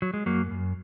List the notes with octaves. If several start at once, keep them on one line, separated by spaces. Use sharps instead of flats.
F#3
G#3
F#2 F#3 A#3
F#2